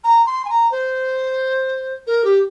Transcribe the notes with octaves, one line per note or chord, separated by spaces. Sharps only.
A#5
C6
G#5
A#5
C5
A#4
G4